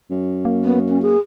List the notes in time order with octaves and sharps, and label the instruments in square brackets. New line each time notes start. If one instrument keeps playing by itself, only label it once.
[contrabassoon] F#2
[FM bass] A#3
[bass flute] B3
C#4
G#4